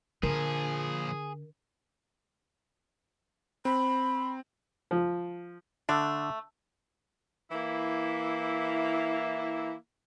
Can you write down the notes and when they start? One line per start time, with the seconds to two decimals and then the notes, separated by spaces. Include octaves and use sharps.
0.23 A#2 D3 F3 G#4 A#4
3.65 C4 B5
4.91 F3
5.89 D3 A3 D4
7.51 E3 A#3 E4